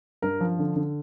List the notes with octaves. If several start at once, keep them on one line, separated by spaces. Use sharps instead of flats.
G2 A#4
F3
D3
D3